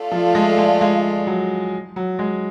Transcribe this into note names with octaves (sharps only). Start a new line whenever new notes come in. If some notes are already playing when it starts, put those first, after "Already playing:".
Already playing: A3 F4 A4 D5 F5
F3
G#3
G#3
G#3
F#3
F#3
G#3